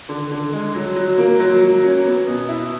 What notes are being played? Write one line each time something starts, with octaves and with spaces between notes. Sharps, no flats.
D3
D3
G#3
F#3
F#3
A#3
F#3
F#3
C#4
B3
B2
E4